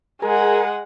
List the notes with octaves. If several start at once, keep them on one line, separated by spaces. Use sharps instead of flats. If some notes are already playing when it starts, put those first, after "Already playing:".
G#3 G#4 A#4 F#5